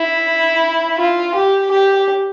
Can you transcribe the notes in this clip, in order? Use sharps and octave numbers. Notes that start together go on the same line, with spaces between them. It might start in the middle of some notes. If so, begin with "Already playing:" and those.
Already playing: E4
F4
G4
G4